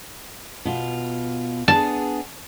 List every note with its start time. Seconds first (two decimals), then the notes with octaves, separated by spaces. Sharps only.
0.65 B2 F4
1.68 B3 D4 G#4 A5